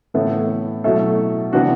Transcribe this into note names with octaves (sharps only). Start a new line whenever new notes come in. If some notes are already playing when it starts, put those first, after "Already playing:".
A2 E3 B3 E4 A4
B2 F#3 A3 E4 A4
C3 E3 B3 D4 F#4